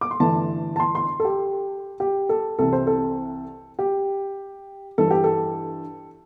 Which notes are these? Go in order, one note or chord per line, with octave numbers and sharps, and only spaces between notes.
D6
C6
G1 G2 E3 A3 A5
A5
C6
C6
A4
G4
G4
A4
C2 C3 E3 A4
C5
A4
G4
G2 E3 G3 D4 A4
G4
A4